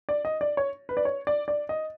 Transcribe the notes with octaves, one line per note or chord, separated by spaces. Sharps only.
D5
D#5
D5
C#5
B4
D5
C#5
D5
D5
D#5